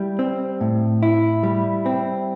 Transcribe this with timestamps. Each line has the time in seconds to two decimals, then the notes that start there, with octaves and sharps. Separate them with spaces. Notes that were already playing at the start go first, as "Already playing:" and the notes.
Already playing: G3 E4
0.19 C4
0.61 A2
1.03 E4
1.43 G3
1.86 C4